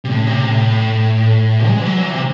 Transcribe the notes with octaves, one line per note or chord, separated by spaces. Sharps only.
C3
A2
C3
A2
G#3
E3
F#3
E3
C3